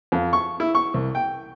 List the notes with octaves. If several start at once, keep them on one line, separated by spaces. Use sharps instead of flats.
F2
C#6
E4
C#6
C2
G5